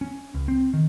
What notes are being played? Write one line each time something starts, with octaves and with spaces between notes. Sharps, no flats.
C#4
C#2
C4
D#3